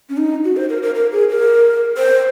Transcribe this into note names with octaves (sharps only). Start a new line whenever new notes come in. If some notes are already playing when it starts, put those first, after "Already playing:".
C#4
D#4
F#4
C5
A#4
A#4
A#4
G#4
A#4
C5